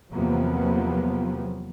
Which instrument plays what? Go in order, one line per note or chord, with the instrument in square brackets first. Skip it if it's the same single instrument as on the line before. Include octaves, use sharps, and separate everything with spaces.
[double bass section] E2 C3 F3 F#3 A#3 B3